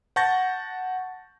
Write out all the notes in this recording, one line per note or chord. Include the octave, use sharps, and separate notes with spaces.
F#5 A5 C#6 G6 A6 A#6